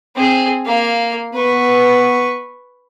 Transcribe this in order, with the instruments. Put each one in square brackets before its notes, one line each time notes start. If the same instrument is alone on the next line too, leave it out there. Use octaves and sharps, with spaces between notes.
[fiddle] C4 G#4
A#3 F5
[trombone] B3 [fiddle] B4 C#6